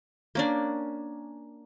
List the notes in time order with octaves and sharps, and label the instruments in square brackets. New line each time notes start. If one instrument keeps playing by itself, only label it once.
[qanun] A#3 C#4 D4